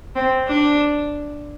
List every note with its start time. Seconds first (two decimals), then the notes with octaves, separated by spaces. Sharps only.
0.16 C4
0.48 D4